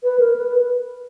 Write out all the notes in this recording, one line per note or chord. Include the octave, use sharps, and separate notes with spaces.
B4
A#4
B4